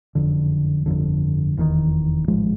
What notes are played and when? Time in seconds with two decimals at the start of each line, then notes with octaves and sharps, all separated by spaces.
0.15 F#1 F2 D3
0.86 G1 F2 D3
1.57 F1 E2 C3 D#3
2.28 A1 G#2 F3 G#3